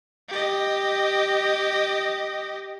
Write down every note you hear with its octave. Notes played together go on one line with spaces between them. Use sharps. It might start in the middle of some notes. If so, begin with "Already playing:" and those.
G4 D#5